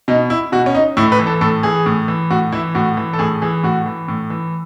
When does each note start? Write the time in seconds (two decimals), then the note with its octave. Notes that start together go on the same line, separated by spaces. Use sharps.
0.08 B2 D#4
0.30 E4
0.52 B2 F#4
0.66 C#4
0.75 D#4
0.97 A2 E4
1.12 B4
1.19 E3
1.27 A4
1.41 A2 A4
1.63 E3 G#4
1.86 A2
2.08 E3
2.31 A2 F#4
2.52 E3 E4
2.75 A2 F#4
2.97 E3
3.13 A4
3.19 A2 G#4
3.42 E3 G#4
3.63 A2 F#4
3.86 E3
4.08 A2
4.30 E3